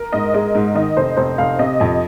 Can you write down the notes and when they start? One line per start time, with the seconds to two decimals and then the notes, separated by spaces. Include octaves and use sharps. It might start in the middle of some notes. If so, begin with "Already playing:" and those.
Already playing: A#4
0.13 G#2 D#5
0.34 G#3 D#5
0.55 G#2
0.75 D#3 D#5
0.97 F1 C5
1.17 F1 C5
1.38 F1 F5
1.59 C3 D#5
1.80 F2 D#5